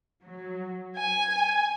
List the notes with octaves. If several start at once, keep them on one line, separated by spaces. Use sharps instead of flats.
F#3
G#5